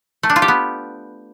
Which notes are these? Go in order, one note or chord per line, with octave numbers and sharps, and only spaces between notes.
A3
D4
F4
G4
B3